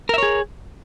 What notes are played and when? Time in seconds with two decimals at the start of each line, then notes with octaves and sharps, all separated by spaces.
0.09 A#4
0.14 E5
0.18 C#5
0.23 G#4